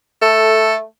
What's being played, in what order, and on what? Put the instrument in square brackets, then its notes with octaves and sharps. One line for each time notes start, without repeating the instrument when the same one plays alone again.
[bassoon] A3 [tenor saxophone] A4